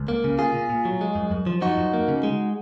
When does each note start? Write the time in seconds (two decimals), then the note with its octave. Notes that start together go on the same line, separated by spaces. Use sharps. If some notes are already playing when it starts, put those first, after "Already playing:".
Already playing: C#2
0.08 A#3
0.24 C#3
0.38 A#3 F4 G#4
0.54 A#2
0.70 A#2
0.85 F#3
1.01 G#3
1.15 F#2
1.31 F#2
1.47 F3
1.62 F3 D#4 F#4
1.77 F#2
1.93 A#3
2.08 C#3
2.23 G#3